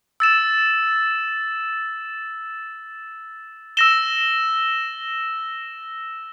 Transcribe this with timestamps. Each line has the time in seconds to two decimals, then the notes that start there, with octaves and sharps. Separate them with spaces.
0.20 E6 A6 E7
3.77 E6 A#6 E7 G7